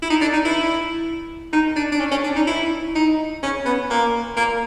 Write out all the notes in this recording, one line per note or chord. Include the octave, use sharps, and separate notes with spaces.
E4
D#4
D4
D#4
E4
D#4
D4
D4
C#4
C#4
D4
D#4
E4
D#4
C#4
B3
A#3
A#3